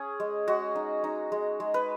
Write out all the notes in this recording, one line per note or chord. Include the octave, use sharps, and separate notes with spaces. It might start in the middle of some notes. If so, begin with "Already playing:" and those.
Already playing: C#4 G#4
G#3
G#3 F#4
D#4
D#4
G#3
G#3
B4